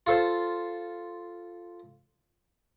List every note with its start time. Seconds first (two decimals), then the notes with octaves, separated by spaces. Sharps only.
0.07 F4 A4 C5